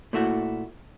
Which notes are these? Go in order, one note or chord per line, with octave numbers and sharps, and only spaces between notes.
A#2 A3 E4 F#4